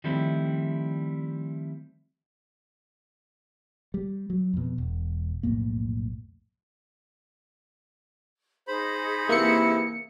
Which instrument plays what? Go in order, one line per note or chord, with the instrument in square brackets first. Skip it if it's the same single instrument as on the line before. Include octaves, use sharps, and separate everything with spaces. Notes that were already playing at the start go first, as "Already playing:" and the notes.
[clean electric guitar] D#3 F3 G3 A3 C4 E4
[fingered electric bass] G3
F#3
F2 B2
E1
B1 F2 A2 A#3
[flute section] D#4 G#4 [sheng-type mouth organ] C5 B5
[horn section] C3 E3 E4 [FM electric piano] A#3 C#7